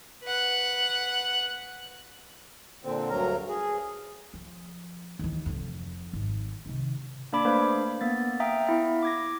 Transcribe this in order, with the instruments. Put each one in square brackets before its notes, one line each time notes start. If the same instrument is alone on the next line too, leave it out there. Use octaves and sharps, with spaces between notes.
[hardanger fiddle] B4 F#5
[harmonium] A#2 D3 C4
D2 G2 F#3 A#4 A#5
G#4
[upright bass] F3
D#2 E3
F1 F2
G#1
C3 D#3
[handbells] A#3 D4 D5 B5 D6
A3 A#3 D4 B4 C5 F5
A#3 B3 A6
E5 F5 G5 A#5 D#6
B3 E4 E5
D6 G#6 A#6